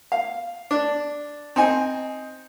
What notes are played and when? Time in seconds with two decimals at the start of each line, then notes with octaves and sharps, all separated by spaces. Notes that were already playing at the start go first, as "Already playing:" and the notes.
0.12 F5
0.71 D4
1.56 C4 D#4 G#5